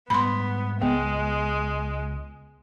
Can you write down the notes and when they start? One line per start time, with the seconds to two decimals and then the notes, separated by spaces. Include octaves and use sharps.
0.10 G#2 G3 B3 B5 C6
0.82 C#2 G#3 B3